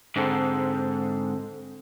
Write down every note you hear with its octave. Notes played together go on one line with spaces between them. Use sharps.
G#2 D3 C4 A4